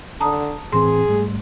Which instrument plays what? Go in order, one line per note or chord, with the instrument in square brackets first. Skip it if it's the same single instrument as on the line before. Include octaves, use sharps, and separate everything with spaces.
[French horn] D3 [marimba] A5 A#5 D#6
[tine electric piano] A2 E3 C4 [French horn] G#4 [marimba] C6
[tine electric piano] G#2 G3 A3